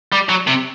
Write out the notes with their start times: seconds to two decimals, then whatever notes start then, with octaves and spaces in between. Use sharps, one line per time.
0.12 G3
0.29 F#3
0.47 C3